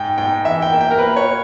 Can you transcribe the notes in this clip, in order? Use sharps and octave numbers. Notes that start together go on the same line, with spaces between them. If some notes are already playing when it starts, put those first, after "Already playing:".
Already playing: G#2 G5
G#2 G5
E3 E5
G5
A#3
G5
A#4
A#3 B4
C#5